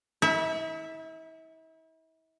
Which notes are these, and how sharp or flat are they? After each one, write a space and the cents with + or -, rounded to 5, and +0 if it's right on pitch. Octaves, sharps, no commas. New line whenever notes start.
E4 -40 E5 +0